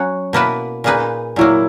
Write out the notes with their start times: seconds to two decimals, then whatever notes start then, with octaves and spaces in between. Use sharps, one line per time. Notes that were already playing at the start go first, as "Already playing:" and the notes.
Already playing: F#3 C#4 F#4 C#5
0.33 B2 A#3 E4 B4
0.84 A#2 A#3 D#4 G#4 B4
1.36 A#2 F#3 A#3 E4